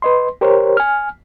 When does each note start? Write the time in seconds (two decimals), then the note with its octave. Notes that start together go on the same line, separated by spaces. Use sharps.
0.02 B4 D#5 C6
0.41 G4 A#4 C5 C#5
0.77 G#5 F6